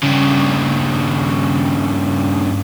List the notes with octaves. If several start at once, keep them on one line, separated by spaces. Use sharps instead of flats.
G2 C#3